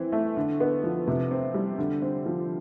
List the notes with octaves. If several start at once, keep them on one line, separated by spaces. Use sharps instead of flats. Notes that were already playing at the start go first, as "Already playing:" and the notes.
Already playing: E3 C4
A3
D3
B3
F3
C3
C4
G3
D3
C4
F3